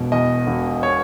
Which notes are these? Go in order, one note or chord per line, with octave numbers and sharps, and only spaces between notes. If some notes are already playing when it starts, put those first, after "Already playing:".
Already playing: E1 B2
E2 D#5
E1
C#5